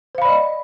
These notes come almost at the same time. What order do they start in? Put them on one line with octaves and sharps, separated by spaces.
C5 F5 B5 D5 D#5